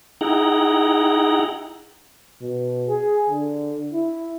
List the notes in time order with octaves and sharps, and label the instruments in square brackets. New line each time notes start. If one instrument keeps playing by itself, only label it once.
[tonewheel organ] D#4 E4 G#4 F#5 G5 A#5
[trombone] B2
G#4
D3
E4